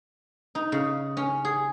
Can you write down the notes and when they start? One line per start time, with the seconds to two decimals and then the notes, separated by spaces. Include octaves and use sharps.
0.55 D#4
0.72 C#3
1.17 C#4
1.45 G#4